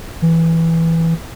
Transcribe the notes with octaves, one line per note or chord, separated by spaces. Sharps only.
E3